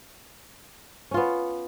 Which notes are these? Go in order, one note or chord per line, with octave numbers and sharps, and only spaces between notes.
B3 C#4 F4